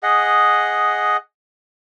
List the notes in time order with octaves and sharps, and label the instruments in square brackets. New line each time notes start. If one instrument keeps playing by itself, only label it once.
[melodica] G#4 D#5 F#5